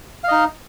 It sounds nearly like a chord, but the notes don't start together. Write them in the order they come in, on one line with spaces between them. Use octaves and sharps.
F5 D#5 D#4